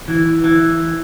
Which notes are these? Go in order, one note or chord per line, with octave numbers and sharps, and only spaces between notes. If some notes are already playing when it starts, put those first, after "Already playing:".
E3
E3